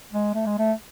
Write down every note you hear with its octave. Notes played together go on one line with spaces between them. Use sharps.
G#3
A3
G#3
A3